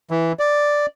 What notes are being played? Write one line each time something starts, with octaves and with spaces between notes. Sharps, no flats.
E3
D5